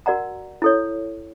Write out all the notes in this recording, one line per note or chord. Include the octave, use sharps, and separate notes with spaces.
F#4 A#4 D5 F#5 A#5
E4 A4 C#5